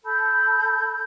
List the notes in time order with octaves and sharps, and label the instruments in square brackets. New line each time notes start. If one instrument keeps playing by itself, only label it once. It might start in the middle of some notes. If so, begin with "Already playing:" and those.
[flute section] A4 B5 G6